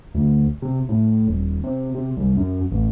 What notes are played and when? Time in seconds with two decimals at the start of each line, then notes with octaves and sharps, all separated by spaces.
0.15 D2
0.62 C3
0.89 A2
1.08 A2
1.28 D#1
1.64 C3
1.95 C3
2.17 C2
2.37 F#2
2.71 A1